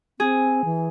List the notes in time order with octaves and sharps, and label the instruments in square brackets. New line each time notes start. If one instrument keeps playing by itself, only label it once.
[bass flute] C4 [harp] G#4
[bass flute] E3